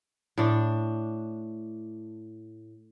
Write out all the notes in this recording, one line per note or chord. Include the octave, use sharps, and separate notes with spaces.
A2 D4